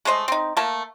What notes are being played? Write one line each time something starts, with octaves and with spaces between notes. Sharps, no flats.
G#3 A3 C5 D#5
C4 D#4
A3 A#3 A5